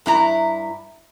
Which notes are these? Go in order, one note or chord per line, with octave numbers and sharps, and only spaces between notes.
G2 E4 A#5